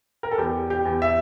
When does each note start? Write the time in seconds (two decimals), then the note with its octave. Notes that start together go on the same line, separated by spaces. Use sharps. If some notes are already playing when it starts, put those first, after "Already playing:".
0.23 A#4
0.31 A4
0.38 E2 G4
0.70 G4
0.85 E2
1.02 E5